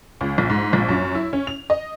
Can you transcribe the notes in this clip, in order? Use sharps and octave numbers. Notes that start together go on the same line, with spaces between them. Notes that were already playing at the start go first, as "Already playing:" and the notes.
C#2
A#1
G#2
A#1
F#2
E4
C#4
F7
D#5